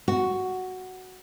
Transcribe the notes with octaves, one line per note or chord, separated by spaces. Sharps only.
F#4